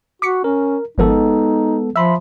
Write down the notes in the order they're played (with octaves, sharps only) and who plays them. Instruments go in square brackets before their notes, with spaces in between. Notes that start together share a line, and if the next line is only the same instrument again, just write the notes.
[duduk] F#4 [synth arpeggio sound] D6 B6 C#7
[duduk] C#4 [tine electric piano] A#4
[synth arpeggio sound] G#1 F3 A#4 [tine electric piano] G#3 B3 A4 [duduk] D#4
[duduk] F3 [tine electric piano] E5 B5 C6 [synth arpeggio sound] E6